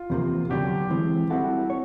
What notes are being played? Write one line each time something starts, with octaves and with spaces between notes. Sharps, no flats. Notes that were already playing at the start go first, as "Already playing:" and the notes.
Already playing: F4
E2 C3 F3 A#3
D3 F#3 B3 D4 F#4 G4
E3 G#3 C4
G3 C4 E4 F#4 A4
C#5